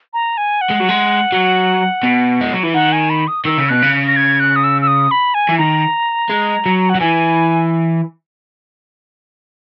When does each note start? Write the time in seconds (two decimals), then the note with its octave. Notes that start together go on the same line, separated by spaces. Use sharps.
0.14 A#5
0.37 G#5
0.61 F#5
0.70 G#3
0.80 F#3
0.88 G#3
1.32 F#3
2.03 B2
2.41 G#3
2.52 F#3
2.63 E3
2.74 D#3 F#5
2.92 G#5
3.10 B5
3.28 D#6
3.45 D#3 E6
3.57 C#3
3.69 B2 F#6
3.83 C#3
4.07 A#6
4.16 G#6
4.40 F#6
4.56 D#6
4.64 E6
4.82 E6
4.87 D#6
5.11 B5
5.34 G#5
5.49 E3
5.58 D#3 A#5
6.29 G#3
6.66 F#3
6.89 F#5
6.95 F#3
7.00 E3 G#5